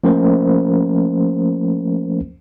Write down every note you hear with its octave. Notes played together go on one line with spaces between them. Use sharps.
F3 A3 A#3 C#4 A#4 C5